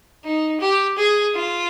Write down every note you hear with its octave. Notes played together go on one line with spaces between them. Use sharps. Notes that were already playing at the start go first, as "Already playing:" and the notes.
D#4
G4
G#4
F4